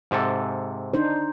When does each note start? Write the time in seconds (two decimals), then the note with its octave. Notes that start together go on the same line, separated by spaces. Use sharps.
0.11 G#2 C3 A4
0.94 D4 D#4 C5